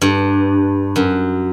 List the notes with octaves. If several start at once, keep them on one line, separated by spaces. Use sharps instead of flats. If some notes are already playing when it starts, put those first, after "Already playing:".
G2
F#2